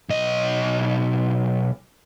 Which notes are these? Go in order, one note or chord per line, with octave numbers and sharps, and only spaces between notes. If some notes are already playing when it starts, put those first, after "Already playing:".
B1 D#5